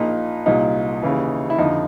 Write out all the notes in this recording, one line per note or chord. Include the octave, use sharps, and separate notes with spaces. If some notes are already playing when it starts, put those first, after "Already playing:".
Already playing: A#1 A#2 D#4
C2 A#2 D#4
D#2 C#3 E3
E4
F2 D3 D#4